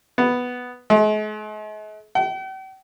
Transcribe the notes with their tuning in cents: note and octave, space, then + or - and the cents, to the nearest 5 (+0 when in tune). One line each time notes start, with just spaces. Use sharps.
B3 +0
G#3 +45
G5 -45